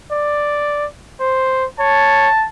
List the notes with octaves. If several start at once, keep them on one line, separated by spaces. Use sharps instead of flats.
D5
C5
C#5 A5